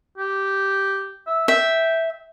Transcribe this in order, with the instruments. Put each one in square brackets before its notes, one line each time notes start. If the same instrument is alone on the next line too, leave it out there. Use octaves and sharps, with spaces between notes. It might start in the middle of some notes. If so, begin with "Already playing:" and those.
[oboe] G4
E5
[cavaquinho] E5 [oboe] G5